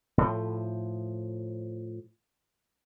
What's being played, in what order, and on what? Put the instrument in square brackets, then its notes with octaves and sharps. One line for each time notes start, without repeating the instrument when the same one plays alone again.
[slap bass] A2 F3